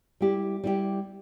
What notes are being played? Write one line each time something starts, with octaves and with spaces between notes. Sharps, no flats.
G3 E4 G4
G3 E4 G4